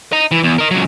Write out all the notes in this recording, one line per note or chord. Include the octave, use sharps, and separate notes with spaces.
D#5 A#5
E3
E2
A#4 D#5
C#2 F#3